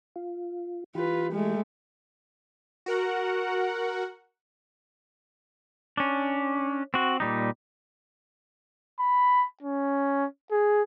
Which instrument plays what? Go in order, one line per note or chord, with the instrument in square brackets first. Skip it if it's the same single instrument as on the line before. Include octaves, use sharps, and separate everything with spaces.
[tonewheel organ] F4
[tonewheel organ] E3 G4 [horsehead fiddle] F4 B4
[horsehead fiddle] G#3 A3
[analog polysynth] F#4 A#4 F#5
[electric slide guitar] C#4 D4
C4 F#4
A#2 G3 D#4
[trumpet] B5
C#4
G#4